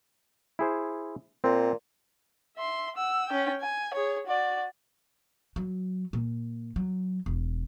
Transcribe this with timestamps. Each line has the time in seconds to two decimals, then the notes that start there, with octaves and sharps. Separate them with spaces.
0.59 E4 G#4 C5
1.44 A#2 C4
2.57 E5 C6
2.96 F#5 E6
3.28 C#4 G5
3.61 G#5
3.94 G#4 C#5
4.26 F#4 D5
5.56 F#3
6.13 A#2
6.76 F#3
7.26 E1